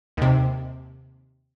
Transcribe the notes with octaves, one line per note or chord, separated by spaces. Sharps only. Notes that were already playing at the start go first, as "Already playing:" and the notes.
D#2 C3